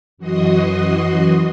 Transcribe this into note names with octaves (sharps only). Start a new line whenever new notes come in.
F#2 E3 F#4 D#5 C6 D#6